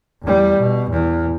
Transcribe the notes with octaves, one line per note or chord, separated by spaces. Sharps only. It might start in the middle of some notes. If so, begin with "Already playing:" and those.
E2 G3
B2
E2